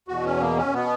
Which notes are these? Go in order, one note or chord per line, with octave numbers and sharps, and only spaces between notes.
E2 B2 F#4
C#4
A#3
C#4
B2 B3